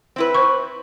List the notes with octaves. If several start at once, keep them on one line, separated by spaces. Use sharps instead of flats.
C4 E4 B4
C5 C#6